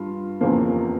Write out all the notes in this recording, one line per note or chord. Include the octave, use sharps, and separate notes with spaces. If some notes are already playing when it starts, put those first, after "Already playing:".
Already playing: G2 G3 F4
F1 E2 C#3 F3 A#3